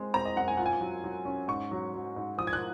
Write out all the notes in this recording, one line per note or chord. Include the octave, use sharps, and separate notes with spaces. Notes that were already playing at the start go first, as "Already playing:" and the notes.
Already playing: G#3 C4
C4 A#5
D#5
F#2 F#5
G#5
F4 F#5
G#5
F#3
F#3
C#4
G#2 C#6
F#3
F#3
G#2
F3 D#6
G#6
F#6